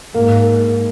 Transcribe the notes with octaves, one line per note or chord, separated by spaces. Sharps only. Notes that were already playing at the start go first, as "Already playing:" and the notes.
G#2 A#3